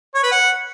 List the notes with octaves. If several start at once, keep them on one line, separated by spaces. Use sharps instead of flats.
C#5
B4
F#5